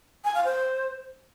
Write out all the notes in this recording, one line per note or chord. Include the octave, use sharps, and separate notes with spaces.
G#5
F5
C5